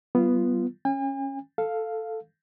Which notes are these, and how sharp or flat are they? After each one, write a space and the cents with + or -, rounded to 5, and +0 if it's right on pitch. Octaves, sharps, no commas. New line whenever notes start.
G3 -40 B3 +0 F4 -25
C#4 -10 G#5 -45
A4 +0 F5 +0